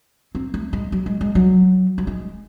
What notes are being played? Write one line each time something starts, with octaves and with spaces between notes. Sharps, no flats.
C4
A3
G#3
F#3
G#3
G#3
F#3
F#3
G#3